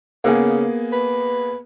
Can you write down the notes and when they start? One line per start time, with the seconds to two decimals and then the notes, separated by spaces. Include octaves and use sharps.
0.24 C#3 A#3 B3 G#4
0.92 B4